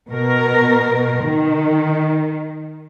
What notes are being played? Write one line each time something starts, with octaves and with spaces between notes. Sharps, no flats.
B2 A#4
D#3